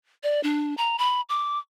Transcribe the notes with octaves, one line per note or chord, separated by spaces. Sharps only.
D5
D4
A#5
B5
D6